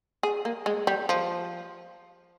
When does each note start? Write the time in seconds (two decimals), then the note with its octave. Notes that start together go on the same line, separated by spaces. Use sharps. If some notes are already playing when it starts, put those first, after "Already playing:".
0.23 G#4
0.45 A#3
0.66 G#3
0.87 G3
1.09 F3